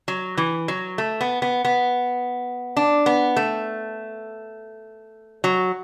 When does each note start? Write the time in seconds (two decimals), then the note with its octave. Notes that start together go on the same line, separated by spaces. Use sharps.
0.08 F#3
0.38 E3
0.68 F#3
0.98 A3
1.21 B3
1.42 B3
1.65 B3
2.77 D4
3.06 B3
3.37 A3
5.44 F#3